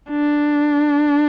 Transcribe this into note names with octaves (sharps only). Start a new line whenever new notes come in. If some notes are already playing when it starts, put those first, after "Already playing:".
D4